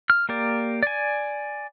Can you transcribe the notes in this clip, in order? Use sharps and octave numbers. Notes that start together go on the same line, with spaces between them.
F6
A#3 G4 A#4 D5
D5 G#5